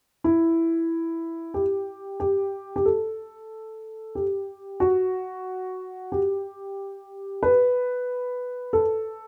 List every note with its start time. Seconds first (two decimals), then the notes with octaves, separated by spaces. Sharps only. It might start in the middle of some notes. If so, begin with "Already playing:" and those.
0.24 E4
1.54 G4
2.20 G4
2.76 G4
2.85 A4
4.15 G4
4.80 F#4
6.12 G4
7.43 B4
8.73 A4